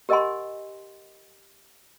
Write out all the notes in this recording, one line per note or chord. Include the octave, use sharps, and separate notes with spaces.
G4 A#4 D#5 F#5 G#5 C6